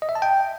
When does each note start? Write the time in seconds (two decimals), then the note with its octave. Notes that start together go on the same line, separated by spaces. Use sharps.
0.02 D#5
0.09 E5
0.15 A5
0.22 G5